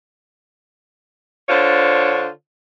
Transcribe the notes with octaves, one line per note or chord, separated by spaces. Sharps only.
D3 D4 F4 C5 C#5